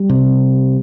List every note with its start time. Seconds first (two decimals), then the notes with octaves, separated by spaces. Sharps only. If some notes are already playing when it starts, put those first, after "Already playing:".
Already playing: G3
0.10 C3